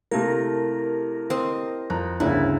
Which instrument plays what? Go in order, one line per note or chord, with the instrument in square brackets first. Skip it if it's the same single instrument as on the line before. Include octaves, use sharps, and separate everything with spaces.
[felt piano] C3 A3 A#3 [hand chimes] E4 G4 A5 [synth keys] A#4
[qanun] C4 D#5
[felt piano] F2 A#5 [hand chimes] F#6
[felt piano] G1 D2 C#3 [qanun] E4 [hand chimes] E5 A#5 F#6